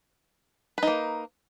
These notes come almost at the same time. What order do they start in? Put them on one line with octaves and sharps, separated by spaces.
B4 D#4 A#3